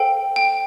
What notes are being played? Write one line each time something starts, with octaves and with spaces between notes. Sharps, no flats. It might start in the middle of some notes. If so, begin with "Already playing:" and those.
Already playing: A4 C5 F5 G5
G5